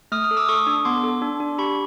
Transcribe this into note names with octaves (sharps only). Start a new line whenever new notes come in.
A3 D#6 F6
D#6 F6
A4
D6 E6
A4 C#6 D#6
D4
B3 C6 D6
A4
D4
D4
G4 B5 C#6